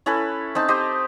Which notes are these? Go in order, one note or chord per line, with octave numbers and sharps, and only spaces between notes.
C#4 E4 A4 B4
C4 D#4 A5
G4 C5 D#5